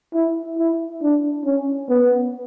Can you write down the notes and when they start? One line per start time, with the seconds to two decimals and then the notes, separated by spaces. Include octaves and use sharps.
0.14 E4
0.59 E4
1.02 D4
1.45 C#4
1.89 B3